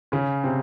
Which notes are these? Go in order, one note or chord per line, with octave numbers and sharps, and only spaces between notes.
C#3 C#4
C3 C4